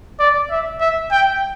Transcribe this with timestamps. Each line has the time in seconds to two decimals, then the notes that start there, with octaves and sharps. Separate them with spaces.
0.20 D5
0.50 E5
0.80 E5
1.12 G5